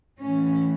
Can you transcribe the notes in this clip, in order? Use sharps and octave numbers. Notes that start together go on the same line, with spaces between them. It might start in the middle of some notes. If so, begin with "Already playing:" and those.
A2 E3 C#4